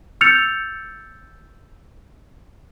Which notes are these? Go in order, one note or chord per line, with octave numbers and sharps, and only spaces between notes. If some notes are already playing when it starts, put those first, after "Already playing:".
E6 F6 G6 A6 C#7 F7